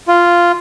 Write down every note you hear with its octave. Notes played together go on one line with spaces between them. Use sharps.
F4